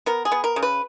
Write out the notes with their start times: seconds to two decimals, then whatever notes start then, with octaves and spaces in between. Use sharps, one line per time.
0.06 B3 A#4
0.25 G#4
0.32 B3
0.44 A#4
0.56 C#3
0.63 B4